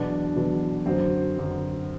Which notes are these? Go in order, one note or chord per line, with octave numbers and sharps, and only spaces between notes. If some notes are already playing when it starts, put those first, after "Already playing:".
Already playing: E2 B2 F#3 D4
E2 B2 F#3
F#2 D3 F#3 C4
F#2 D3 F#3